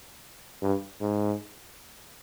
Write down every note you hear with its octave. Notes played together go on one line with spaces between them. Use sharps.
G2
G#2